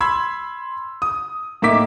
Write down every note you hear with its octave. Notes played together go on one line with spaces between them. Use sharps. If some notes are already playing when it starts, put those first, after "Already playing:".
B5 C6 E6 G#6
D#6
A2 A#3 D#4 E5 D6 B6